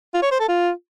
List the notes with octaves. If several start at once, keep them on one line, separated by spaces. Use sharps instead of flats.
F4
C#5
C5
A4
F4